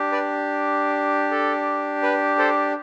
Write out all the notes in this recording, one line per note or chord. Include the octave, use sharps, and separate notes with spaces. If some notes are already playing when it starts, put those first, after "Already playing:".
Already playing: D4 G4
B4 D5
A4
B4
A4 C5